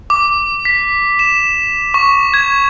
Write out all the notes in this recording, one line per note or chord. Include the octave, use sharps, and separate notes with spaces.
D6
B6
E7
C#6
G#6